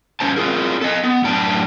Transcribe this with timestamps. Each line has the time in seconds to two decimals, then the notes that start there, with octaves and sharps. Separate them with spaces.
0.20 G2 E3 C#4 C5 A5
0.36 C4 F4 G#4 A#4
0.81 A4 D#5
1.03 B3
1.24 F#2 A2 D4 G5 A5